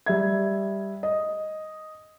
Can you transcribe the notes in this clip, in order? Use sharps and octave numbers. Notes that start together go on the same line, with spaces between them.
G3 E5 G#6
D#5